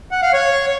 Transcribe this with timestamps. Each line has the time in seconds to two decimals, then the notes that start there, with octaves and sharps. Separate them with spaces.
0.11 F#5
0.22 F5
0.33 C#5